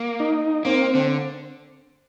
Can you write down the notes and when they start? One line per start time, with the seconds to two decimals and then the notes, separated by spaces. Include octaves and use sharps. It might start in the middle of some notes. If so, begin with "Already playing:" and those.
Already playing: A#3
0.20 D#4
0.65 A#3 C4
0.95 D3